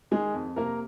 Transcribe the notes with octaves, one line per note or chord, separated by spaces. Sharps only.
D#3 G#3 G#4
F2
C3 A#3 A#4